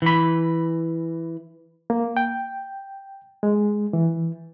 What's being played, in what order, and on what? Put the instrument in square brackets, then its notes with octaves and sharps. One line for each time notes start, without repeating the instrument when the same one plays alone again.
[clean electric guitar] E3 B5
[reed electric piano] A#3
G5
G#3
E3